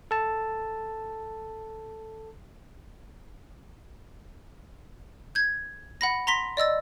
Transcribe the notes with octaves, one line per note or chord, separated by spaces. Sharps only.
A4 A5
G6 G#6
F#5 B5 A#6
A#5 C6 A#6 B6 G7
D5 D#5 E6 A6